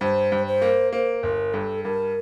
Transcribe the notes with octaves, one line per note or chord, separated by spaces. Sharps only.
G2 C5
G2
C5
A#3
A#3 C5
G1 A#4
G2 A4
G2 A#4